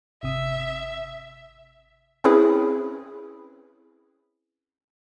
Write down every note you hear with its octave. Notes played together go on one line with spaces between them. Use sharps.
G#1 C3 E5 D#6
C4 C#4 E4 G#4 B4